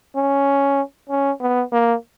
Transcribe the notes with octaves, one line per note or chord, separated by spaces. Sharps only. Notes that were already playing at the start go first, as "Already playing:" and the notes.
C#4
C#4
B3
A#3